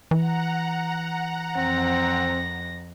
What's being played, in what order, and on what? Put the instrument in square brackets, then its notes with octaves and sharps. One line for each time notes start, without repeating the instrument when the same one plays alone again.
[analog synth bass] E3 [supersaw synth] F#5 A#5
[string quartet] F2 A#6 [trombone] C4